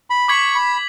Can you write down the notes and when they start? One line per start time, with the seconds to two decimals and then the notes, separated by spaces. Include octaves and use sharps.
0.10 B5
0.28 C#6 D6 G#6 B6 F#7
0.55 B5